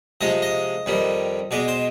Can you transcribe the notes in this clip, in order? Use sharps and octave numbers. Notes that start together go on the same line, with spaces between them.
C3 F3 G#3 D#5
D#5
F2 D#3 G3
B2 G#3 D5
C5